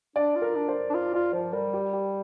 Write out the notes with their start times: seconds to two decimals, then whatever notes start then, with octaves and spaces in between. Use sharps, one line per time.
0.16 D4 D5
0.36 F4
0.42 A#4
0.55 D4
0.68 C5
0.90 D4
0.94 F4 C5
1.14 F4 D5
1.33 F3 C5
1.53 G3 A#4
1.74 G4
1.93 G4